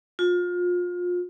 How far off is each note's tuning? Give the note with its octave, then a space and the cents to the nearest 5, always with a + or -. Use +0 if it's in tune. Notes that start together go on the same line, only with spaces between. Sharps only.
F4 +30